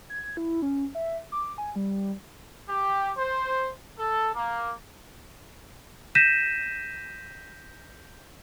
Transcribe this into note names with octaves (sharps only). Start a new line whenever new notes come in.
G#6
E4
C#4
E5
D6
G#5
G3
G4
C5
A4
A#3
G6 A#6 B6 D#7 E7